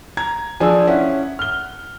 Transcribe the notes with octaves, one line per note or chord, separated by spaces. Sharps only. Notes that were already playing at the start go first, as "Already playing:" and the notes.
A#5 G#6
F3 D4 G#4 G#5 E6
C#4 E4 F#5
F6 G7